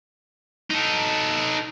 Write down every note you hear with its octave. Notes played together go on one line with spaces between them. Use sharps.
D#4 A4